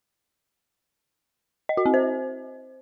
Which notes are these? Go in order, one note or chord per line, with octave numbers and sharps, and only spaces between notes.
D#5
F#4
C4
C5